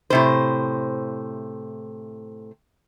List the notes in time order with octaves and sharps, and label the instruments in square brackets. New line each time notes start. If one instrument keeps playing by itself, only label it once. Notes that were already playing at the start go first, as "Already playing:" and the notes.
[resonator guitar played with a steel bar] A2 C3 C5